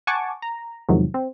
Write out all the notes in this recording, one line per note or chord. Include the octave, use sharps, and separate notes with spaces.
F#5 G#5 A5 C#6 D6
A#5
E2 G#2 C3 D#3 F3 F#3
C4